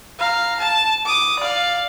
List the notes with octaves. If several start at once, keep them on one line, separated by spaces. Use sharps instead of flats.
F5 A#5
A5
D6 D#6
D5 F5